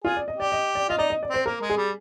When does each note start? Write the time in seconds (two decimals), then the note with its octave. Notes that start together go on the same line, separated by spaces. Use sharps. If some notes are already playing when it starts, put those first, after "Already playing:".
0.04 F4 G#4
0.17 D5
0.28 D#5
0.36 G4 D5
0.52 D#5
0.75 D5
0.89 F4 D#5
0.98 D#4 D5
1.10 D#5
1.23 D5
1.30 C4 C5
1.46 A#3 A#4
1.61 G#3
1.70 G#4
1.77 G3